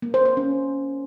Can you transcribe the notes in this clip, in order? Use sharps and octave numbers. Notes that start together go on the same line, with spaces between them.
A#3
C5
C5
C#4